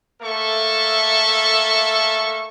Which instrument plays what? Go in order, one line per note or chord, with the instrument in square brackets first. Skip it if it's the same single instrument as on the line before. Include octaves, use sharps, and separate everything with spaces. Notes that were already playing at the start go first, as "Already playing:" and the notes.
[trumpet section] A3 A#3 A4 E5 C#6